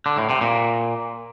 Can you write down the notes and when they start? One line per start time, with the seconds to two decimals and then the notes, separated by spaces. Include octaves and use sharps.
0.06 D3
0.18 A2
0.30 C3
0.41 A#2